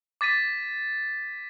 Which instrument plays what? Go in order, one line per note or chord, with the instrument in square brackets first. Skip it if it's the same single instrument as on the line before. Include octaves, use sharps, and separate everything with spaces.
[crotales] D6 A6 B6 D#7